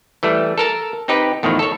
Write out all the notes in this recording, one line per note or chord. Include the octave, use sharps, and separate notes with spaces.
E3 G3 A3
A4 A#4 A5
C4 D#4 G4 B4
E2 A2 D#3 F3
A4 C#5